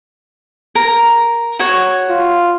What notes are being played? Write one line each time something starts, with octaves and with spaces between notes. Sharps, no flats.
A#4
F#4 C#5
F4